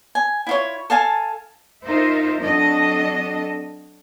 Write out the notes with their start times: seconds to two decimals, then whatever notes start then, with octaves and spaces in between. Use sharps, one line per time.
0.15 G#5
0.47 E4 F4 C#5
0.90 A4 F5 G#5 A5
1.85 D#4 F4 A#4 C5 E5
2.43 F#3 C4 D4 A4 D#5